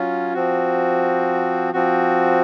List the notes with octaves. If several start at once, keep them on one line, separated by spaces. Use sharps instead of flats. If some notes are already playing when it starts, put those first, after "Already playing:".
Already playing: F#3 C#4 F4
F3 C4 F#4
F3 C4 F#4